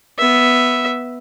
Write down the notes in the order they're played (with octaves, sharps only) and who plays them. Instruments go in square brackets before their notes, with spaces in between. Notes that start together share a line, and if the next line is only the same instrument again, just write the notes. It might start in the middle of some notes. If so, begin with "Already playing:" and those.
[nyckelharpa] B3 E5